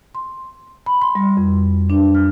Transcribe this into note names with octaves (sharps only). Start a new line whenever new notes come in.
C6
B5
C6
G3
F2
D4
F6